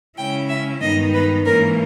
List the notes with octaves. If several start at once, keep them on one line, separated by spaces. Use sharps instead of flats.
C#3 G#3 C#4 E4 G5
E5
G2 D#3 G#3 B3 D#4 D#5
B4
G#2 E3 A#3 C#4 A#4